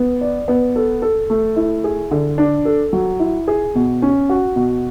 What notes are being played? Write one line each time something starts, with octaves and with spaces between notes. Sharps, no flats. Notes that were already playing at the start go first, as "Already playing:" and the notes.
Already playing: B3
D5
B3
A4
A4
A3
E4
G#4
D3
D4
A4
F#3
E4
G#4
B2
C#4
F#4
B2